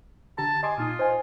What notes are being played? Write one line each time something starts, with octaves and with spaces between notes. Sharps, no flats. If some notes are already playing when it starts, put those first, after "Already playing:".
D3 G4 A5 A#5
D#5 G#5 C6 D6
A#2 D#4 F4 D#6
C5 D#5 G#5